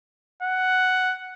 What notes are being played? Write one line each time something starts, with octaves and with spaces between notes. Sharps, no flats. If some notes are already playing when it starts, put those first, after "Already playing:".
F#5